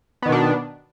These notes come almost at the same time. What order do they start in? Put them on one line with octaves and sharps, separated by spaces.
B3 D#3 B2 D4